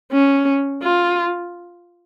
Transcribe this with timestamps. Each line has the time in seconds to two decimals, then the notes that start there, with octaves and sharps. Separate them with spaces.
0.12 C#4
0.83 F4